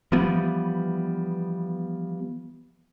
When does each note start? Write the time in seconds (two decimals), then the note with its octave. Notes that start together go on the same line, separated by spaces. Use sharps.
0.12 E3 F3 G3 B3